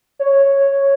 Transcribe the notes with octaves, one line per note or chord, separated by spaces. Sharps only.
C#5